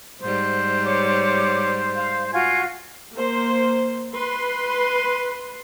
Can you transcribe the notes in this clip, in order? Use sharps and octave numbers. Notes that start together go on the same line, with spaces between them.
G#2 G3 C5
C#5 D6
F5
F4 F#4 F5 G#5
A#3 C5
B4 C6